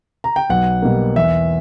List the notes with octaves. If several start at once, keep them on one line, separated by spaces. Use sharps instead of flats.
A#5
G5
B1 F#5
B2 G3 A#3
E2 E5